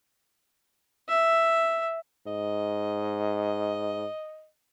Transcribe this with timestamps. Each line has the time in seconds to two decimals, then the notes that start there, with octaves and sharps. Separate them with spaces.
1.09 E5
2.27 G#2 D#5